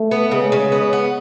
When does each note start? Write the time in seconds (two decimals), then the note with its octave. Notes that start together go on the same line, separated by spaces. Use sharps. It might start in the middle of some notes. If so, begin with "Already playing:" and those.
Already playing: A3
0.11 B3
0.31 C#3 G#3
0.52 C#3
0.72 B3
0.93 B3